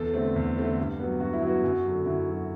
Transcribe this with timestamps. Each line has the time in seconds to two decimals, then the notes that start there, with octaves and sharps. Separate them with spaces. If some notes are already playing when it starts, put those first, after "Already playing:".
Already playing: E2 A4
0.14 D3 A3 C4
0.36 E2
0.57 D3 A3 C4
0.78 G2
0.99 F#3 B3
1.20 G2 F#4
1.33 E4
1.42 F#3 B3 F#4
1.64 F#2
1.85 D3 F#3
2.05 F#2 E4
2.26 D3 F#3